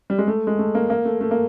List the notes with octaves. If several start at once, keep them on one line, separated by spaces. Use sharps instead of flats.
G3
G#3
A3
G#3
A3
A#3
A#3
A3
A3
A#3